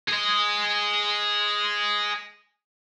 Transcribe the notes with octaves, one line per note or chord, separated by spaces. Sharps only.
G#4 D#5